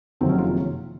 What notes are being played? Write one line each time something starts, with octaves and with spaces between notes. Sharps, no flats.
F#1 F2 C3 D#3 F#3 C4
C#4
F4